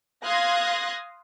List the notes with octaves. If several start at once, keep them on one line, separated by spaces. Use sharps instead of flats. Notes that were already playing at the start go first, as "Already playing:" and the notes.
F5 C6 D#6 F#6 G#6 A#6